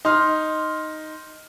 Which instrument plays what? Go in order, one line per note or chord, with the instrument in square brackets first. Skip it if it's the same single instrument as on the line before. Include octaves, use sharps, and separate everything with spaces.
[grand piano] D#4 C6 F6